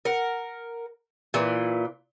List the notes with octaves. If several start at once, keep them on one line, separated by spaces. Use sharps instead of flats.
A#4 F#5
A#2 E3